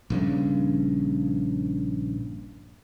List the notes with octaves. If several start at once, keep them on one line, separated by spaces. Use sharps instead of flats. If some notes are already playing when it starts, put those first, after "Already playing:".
A#1 G2 C#3